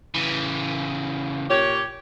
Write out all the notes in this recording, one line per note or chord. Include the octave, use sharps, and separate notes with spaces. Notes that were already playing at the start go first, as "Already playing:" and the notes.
C#3 E3
A#2 G4 C#5